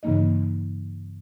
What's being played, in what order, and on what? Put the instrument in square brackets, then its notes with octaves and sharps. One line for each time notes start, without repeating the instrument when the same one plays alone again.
[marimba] G2 C#3 E3 A#3 D#4 D#5